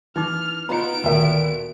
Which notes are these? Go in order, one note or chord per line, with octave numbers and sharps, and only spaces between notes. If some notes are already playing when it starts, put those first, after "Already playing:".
E3 C#4 D#4 D6 F6
B3 D#4 F4 B4 A#5 D7
D2 A#2 D#3 A4 A#4 E5 A5